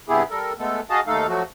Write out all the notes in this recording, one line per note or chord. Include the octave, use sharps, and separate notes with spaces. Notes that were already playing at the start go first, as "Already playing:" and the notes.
G2 C3 B3 E4 G4 G#4
G3 A4 A#4
G#3 A3 B3 A4
F#4 G#4 D#5 F5 A5 D#6
D#2 A3 D#4 A4 F5
F3 F#3 A3 F#4